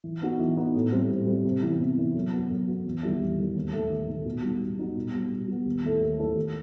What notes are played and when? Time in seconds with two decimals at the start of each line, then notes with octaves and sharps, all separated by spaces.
0.04 E3
0.21 B3 D#4 F#4
0.39 E3
0.57 B3 D#4 F#4
0.75 A2
0.92 G3 C4
1.10 A2
1.27 G3 C4
1.45 C3
1.62 E3 B3 E4
1.80 C3
1.97 E3 B3 E4
2.15 F#2
2.33 F#3 B3
2.50 F#2
2.68 F#3 B3
2.85 E2
3.03 D#3 G3 B3 E4
3.20 E2
3.38 D#3 G3 B3 E4
3.55 D#2
3.73 D#3 A3
3.90 D#2
4.08 D#3 A3
4.26 B2
4.43 G3 D#4 F#4
4.60 B2
4.78 G3 D#4 F#4
4.96 B2
5.13 G3 B3
5.31 B2
5.48 G3 B3
5.66 D#2
5.83 D#3 A3 E4 A4
6.00 D#2
6.19 D#3 A3 E4 A4
6.36 D#2